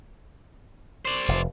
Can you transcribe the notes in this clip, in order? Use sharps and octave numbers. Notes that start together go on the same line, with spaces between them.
C5 D5
F1